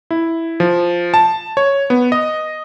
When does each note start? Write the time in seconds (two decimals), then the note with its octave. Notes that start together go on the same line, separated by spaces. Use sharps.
0.11 E4
0.60 F3
1.14 A5
1.57 C#5
1.90 B3
2.12 D#5